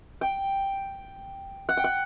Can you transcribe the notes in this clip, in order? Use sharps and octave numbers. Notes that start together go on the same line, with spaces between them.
G5
F#5
G5
F#5